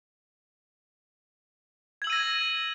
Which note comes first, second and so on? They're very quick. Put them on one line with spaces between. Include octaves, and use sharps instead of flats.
G#6 F#7 E6 D#7 A#6